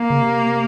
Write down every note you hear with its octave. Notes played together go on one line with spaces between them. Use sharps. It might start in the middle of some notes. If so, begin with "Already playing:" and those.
Already playing: A#3
C#3
C3